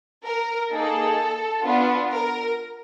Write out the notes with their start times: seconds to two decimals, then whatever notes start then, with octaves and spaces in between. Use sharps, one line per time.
0.24 A#4
0.70 A#3 D#4 G#4 A4
1.63 B3 D4 F4
2.11 A#4